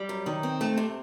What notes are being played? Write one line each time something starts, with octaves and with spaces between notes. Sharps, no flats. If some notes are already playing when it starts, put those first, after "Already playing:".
Already playing: G3
F#2
D#3
C4
A3
C3